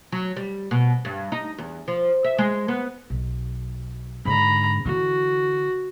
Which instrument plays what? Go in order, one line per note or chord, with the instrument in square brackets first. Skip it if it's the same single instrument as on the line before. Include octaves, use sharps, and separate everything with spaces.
[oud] F#3
G3
B2
G2
D#4
E2
F3
E5
G#3
B3
[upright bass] B1
[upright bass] G#2 D3 [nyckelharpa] A#5 B5
[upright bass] D3 E3 [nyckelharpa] F#4